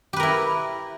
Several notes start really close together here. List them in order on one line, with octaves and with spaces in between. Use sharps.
G4 B4 A#4 E4